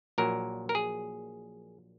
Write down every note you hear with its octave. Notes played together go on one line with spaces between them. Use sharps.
A#1 A#2 F#3 A#4
A#4
G#4